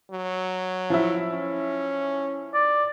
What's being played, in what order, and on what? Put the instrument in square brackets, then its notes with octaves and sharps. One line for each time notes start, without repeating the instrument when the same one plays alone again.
[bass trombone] F#3
[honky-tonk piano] F3 E4
[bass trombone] C#4
[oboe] D5